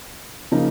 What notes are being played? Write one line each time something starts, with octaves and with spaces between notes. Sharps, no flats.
C#3 F3 A#3 D#4